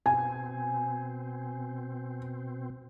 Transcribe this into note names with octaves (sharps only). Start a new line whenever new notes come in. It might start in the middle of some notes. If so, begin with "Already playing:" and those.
B2 C4 G#5